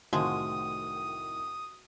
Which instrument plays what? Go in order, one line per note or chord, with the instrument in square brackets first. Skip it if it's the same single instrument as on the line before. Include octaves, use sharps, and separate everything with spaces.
[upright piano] C2 A2 D#3 [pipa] F3 G#3 [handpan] F#4 [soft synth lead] D#6